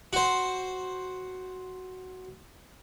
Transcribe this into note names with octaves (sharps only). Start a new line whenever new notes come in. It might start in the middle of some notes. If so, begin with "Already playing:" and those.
F#4 C5